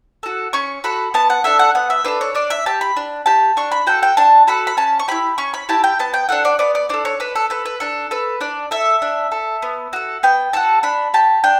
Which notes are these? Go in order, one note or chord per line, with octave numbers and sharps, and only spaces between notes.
F#4 A4
C#4 C#6
F#4 A4 B5
B3 A5
F#5
D4 A4 E5
F#5
B3 F#5
E5
D4 A4 B4
C#5
D4 D5
E5
G4 A5
B5
D4
G4 A5
D4 C#6
B5
F#4 A4 G5
G5
D4 A5
F#4 A4 B5
B5
C#4 A5
C#6
E4 G4 B5
C#4 C#6
B5
E4 G4 A5
G5
B3 A5
G5
D4 A4 F#5
D5
B3 D5
D5
D4 A4 D5
C#5
D4 B4
A4
A4 B4
B4
D4 A4
A4 B4
D4 D5
A4 E5
D4
A4
B3
F#4 A4
B3 G5
F#4 A4 A5
D4 B5
G4 A5
D4 G5